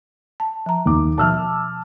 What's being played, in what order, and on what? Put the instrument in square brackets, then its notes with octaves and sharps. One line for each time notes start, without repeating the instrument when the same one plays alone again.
[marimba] A5
F3 A#5
[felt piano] D#2 D6
[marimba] B2 F3 [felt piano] A5 E6 F6